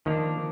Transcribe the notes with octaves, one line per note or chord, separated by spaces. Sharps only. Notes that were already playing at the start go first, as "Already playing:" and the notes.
D#3 F3 A#3 D4